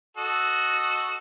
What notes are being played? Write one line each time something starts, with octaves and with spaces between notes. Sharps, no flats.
F#4 A4 D#5